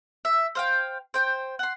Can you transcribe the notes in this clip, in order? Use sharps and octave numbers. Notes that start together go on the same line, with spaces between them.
E5
C5 F5 G5
C5 G5
F#5 C6